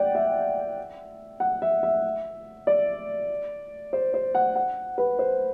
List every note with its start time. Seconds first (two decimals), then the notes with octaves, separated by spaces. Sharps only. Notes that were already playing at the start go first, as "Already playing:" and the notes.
Already playing: D5 F#5 G5
0.15 E5
1.40 F#5
1.62 E5
1.83 E5
2.67 D5
3.93 C5
4.14 C5
4.35 F#5
4.55 F#5
4.98 B4
5.19 C5